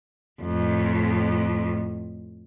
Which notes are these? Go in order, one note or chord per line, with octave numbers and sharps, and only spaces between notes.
F2 A2